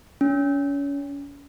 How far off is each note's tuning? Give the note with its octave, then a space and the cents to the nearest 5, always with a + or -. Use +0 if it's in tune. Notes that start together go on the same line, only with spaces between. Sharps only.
C#4 +30